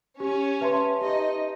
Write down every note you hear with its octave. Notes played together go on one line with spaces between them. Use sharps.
C#4 G4 C#5
B4 E5 A5 C6
D#4 G4 D#5